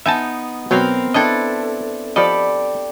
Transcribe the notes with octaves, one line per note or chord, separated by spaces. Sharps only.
B3 D#4 E5 G#5 A5
B2 F#3 B3 C4 A#4 F5
D4 E4 A4 B4 D#5 G5
F3 G4 A4 D5 D#5 B5